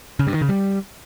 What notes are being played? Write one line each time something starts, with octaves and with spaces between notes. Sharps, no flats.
C#3
G2
D#3
C#3
G3